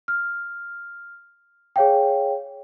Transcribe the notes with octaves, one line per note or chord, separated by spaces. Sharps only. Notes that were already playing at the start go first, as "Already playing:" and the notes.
F6
G#4 C#5 F5 G5